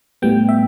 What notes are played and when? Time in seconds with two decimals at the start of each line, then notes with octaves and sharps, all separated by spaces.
0.22 A2 G3 B3 G5
0.49 E5